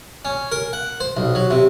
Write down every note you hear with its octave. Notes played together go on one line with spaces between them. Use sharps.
C#4
A#4
F#5
C5
B1
F#3
C3